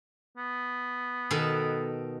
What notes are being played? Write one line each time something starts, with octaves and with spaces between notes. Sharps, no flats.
B3
B2 D#3 A4